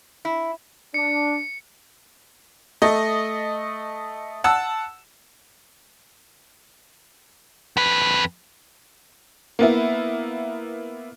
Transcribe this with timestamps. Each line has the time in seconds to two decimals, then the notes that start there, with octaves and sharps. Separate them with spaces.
0.25 E4
0.94 D4 C#7
2.82 A3 D#5
4.44 F#5 A5 E6
7.77 F2 B4
9.59 A#3 B3 E4